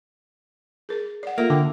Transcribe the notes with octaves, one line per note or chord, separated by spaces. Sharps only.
G#4 A#4
D5 F#5
A#3 F4 A4 E5
D3 G5